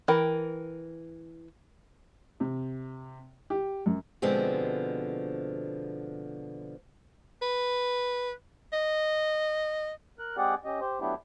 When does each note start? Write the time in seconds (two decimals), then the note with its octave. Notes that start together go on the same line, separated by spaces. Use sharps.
0.08 E3 A#4 G5
2.40 C3
3.50 G4
3.86 F#2
4.22 B2 D3 F3 G#3 C4
7.42 B4
8.73 D#5
10.19 A#4 F#6
10.37 G#3 C4 G4 G#4 D5 F#5
10.65 C#4 G4 D#5
10.80 G4 C5
11.00 F#3 A3 B3 D4 E4 G4